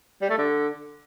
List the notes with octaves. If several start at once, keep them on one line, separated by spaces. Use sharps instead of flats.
G3
A3
D3